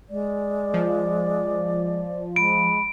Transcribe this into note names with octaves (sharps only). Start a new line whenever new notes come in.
G#3 D5
F3
G#3 B5 D7